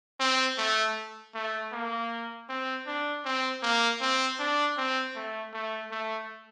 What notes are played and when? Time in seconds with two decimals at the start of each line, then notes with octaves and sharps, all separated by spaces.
0.20 C4
0.58 A3
1.35 A3
1.72 A#3
2.49 C4
2.86 D4
3.25 C4
3.62 A#3
4.00 C4
4.39 D4
4.77 C4
5.15 A3
5.53 A3
5.91 A3